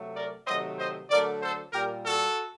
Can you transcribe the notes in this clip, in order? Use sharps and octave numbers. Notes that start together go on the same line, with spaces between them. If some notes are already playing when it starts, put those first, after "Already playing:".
Already playing: C3 F#3 A3
A#4 D5
C3 D#3 F#3 A3 C5 D#5
C5 D#5
D3 F#3 A3 A#4 D5
A4 C5
A#2 G3 G4 A#4
F#4 A4